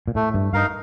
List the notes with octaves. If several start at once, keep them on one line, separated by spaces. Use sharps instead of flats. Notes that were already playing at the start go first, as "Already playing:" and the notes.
A#2
A2 A3
G2
G2 D#4 A#4 F5